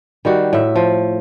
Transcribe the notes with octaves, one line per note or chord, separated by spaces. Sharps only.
D#3 G3 F#4
A2 E5
F3